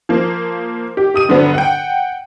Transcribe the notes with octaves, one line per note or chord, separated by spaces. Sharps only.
F3 A#3
G4
G4 D#6 D#7
G2 D3 F#3 B3
F#5 G5